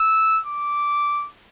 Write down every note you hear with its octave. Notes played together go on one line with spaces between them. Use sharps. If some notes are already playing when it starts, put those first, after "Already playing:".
Already playing: E6
D6